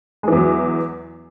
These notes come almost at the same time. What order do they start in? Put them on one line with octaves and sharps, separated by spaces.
G#3 E3 E2 F#3